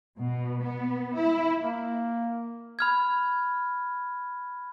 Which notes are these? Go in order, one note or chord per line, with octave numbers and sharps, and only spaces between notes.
B2
B3
E4
A#3
B5 F6 G#6